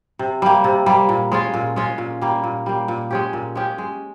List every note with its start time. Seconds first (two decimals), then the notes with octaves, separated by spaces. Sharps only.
0.19 C3
0.42 G3 A#3
0.64 C3
0.86 G3 A#3
1.09 A#2
1.32 G#3 C#4 F4
1.54 A#2
1.76 G#3 C#4 F4
1.98 A#2
2.22 G3 A#3
2.44 A#2
2.66 G3 A#3
2.88 A#2
3.11 G#3 C#4 G4
3.33 A#2
3.55 G#3 C#4 G4
3.78 G#3